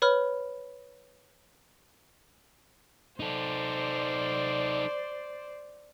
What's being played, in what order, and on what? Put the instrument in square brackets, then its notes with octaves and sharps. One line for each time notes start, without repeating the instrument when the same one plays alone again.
[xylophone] B4 C#5 B5 F6
[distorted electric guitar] D#4 A4 [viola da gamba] C5 D5